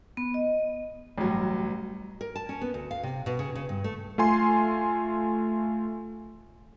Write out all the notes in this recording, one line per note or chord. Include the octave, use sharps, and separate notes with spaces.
B3
D#5
A1 G2 F#3
A#4
A5
C#4
B3
D2
F5
C3
B2
C#3
C#3
G2
A3
A3 F4 G#5 C6